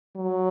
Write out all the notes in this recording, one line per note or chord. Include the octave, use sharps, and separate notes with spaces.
F#3